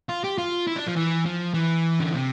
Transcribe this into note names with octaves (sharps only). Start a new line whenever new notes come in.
F4
G4
F4
E4
D4
F3
E3
F3
E3
D3
C3